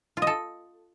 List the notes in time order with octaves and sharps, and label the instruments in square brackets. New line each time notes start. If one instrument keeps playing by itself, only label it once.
[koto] F4
D#5
A4